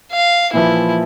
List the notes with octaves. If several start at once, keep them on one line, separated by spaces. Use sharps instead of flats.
F5
A#2 E3 F3 E4